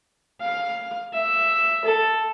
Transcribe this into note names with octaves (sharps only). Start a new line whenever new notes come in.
F5
E5
A4